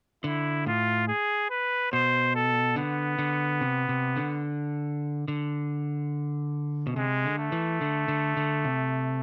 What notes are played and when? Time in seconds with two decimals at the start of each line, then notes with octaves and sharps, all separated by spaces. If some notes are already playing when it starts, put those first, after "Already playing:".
0.24 D3 E4
0.66 A2 F4
1.08 G#4
1.50 B4
1.92 B2 C5
2.35 A4
2.76 D3 B3
3.19 D3
3.61 C3
3.89 C3
4.16 D3
5.28 D3
6.87 B2
6.96 C3 G#3
7.25 D3
7.39 A3
7.52 E3
7.81 D3
8.08 D3
8.37 D3
8.65 C3